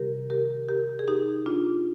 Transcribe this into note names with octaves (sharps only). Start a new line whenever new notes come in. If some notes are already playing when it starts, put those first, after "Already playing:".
Already playing: C3 D#3 G3 G4 A#4
G4 A#4
G4 A#4
G#4
D#4 G4
D4 F4